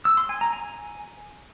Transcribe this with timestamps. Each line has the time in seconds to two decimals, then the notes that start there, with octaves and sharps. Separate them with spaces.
0.05 E6
0.17 C6
0.29 G#5
0.41 A#5
0.53 G#5